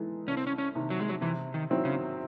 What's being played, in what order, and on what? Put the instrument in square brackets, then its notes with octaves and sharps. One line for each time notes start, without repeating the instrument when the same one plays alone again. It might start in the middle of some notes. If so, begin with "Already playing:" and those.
Already playing: [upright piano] E3 G#3 D#4 A4
[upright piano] C2 [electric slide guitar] C#4
[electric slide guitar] C4
C#4
C#4
[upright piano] C3 D#3
[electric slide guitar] F#3
G#3
F#3
[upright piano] C3 [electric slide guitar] E3
[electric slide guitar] D#3
[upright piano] D#3 F#3 C4 E4
[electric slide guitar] C#3